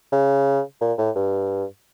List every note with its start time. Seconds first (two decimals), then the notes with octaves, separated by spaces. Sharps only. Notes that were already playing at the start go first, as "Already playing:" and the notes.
0.12 C#3
0.81 A#2
0.98 A2
1.16 G2